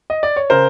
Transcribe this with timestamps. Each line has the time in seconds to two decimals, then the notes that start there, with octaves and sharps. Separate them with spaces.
0.10 D#5
0.23 D5
0.36 C#5
0.50 C#3 A#4 C5